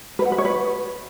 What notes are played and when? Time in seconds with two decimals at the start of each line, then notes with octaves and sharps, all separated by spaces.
0.19 B4
0.25 F#5
0.32 B4
0.38 C#5
0.45 B4